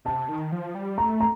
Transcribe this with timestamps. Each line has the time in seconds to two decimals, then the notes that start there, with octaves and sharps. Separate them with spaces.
0.05 C3 A5
0.29 D#3
0.52 F3
0.75 G3
0.98 A3 A#5
1.20 A#5